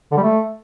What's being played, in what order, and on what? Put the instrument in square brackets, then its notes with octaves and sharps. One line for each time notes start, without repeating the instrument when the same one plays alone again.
[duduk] D3
G3
A3